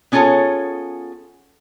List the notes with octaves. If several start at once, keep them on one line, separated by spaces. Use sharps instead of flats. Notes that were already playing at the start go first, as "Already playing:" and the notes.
B3 C#4 F4 G#4 A4 C#5